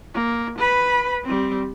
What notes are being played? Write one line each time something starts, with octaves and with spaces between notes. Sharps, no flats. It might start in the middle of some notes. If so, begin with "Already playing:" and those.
A#3
B4 B5
G3 C4